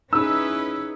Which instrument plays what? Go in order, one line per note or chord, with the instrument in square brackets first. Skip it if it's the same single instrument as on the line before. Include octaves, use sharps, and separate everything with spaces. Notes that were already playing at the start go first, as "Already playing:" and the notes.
[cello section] C#4 E4 B4 [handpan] D#4 G#4 [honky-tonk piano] E6